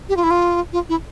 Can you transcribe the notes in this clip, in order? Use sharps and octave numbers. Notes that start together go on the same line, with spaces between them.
G4
F4
E4
F4
F4
E4